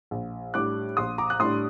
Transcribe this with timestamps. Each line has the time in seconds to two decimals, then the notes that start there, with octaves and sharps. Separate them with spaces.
0.11 A#1
0.54 A2 G3 D4 D6 F#6
0.97 A#1 C6 D#6
1.18 A#5 D6
1.30 F#6
1.40 A2 G3 D4 C6 D#6